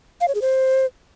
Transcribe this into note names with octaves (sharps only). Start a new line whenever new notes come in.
F5
C#5
G#4
C5